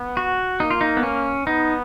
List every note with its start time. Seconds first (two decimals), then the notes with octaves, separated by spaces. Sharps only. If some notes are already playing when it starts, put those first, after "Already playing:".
Already playing: B3
0.17 F#4
0.60 A#3 D#4
0.70 F4
0.81 D#4
0.97 B3
1.03 C#4
1.47 B3 D#4